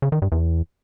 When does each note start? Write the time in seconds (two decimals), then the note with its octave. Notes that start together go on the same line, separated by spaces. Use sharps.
0.02 C#3
0.12 D#3
0.22 G2
0.32 E2